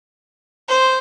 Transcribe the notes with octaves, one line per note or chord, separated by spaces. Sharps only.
C5